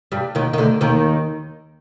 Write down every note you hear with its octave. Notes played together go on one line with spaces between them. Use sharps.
G2 G3
D#2 D#3
D#3
D2 D3
D#2 D#3